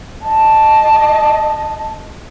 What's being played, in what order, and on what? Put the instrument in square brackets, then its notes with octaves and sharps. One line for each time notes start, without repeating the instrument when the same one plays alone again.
[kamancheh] D#5 A5